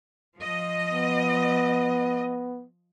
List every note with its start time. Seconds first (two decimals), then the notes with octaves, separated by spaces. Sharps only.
0.37 F3 D#5
0.91 B3